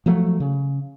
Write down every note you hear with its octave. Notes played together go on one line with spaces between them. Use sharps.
F3 F#3 A3
C#3